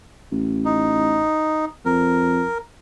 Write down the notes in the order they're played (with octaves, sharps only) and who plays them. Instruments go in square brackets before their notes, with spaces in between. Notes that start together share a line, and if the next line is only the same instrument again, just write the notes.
[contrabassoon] A1
[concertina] D#4
[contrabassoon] F2 [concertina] A#4